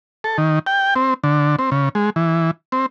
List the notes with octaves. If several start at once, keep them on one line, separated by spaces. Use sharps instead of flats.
A4
D#3
G5
C4
D3
C4
C#3
G#3
E3
C4